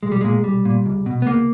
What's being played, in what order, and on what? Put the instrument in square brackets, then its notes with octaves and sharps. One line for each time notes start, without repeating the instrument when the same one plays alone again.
[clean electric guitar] B1 G#3
G3
A#2 G#3
B1 G3
A#2
C#2
B2
B3
C#2 A#3